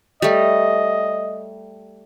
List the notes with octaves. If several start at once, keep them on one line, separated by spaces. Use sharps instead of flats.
G3 A3 D#5